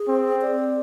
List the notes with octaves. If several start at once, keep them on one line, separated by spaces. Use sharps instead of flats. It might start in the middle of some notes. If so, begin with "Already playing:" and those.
Already playing: G#4
C4
D5